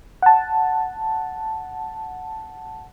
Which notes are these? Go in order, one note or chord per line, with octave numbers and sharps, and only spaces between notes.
F#5 A5